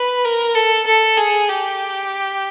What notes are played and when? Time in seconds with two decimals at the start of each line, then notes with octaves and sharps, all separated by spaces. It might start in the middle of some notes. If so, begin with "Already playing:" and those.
Already playing: B4
0.24 A#4
0.55 A4
0.87 A4
1.17 G#4
1.49 G4